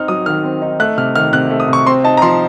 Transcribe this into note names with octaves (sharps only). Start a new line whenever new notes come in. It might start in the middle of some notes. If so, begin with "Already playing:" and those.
Already playing: C4 D#4 F6
F#3 D#6
D#3 F6
C4
D#4
A3 F#6
C3 F6
D#3 F6
C3 F#6
A3
D#6
C3 C#6
C4 C6
D#4 A5
A#5
F3 C6